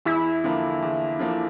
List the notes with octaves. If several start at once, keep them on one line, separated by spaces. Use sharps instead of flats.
E2 E4
D3 F3 A#3
E2
D3 F3 A#3